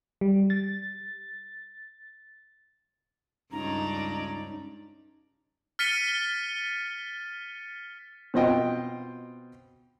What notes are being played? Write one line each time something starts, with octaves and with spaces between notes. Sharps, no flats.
G3
A6
C#2 G2 C#4 D#4 D5 A#5
F6 A6 B6 C#7 D#7 G7
B2 C4 F4 D#5 G5